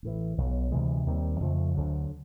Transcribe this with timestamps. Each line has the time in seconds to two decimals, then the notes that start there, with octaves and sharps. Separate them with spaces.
0.03 A1 A2 E3
0.38 B1 B2 F#3
0.71 D2 C3 E3 G#3
1.07 D#2 D#3 G3 C4
1.40 F2 C#3 F3 A3
1.75 D2 D3 F#3